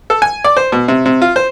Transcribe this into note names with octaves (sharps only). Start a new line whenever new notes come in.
A4
G#5
D5
C5
B2
C3
C3
F4
C5